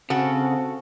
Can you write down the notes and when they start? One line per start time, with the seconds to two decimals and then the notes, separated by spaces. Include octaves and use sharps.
0.10 C#3 C4 F#4 A4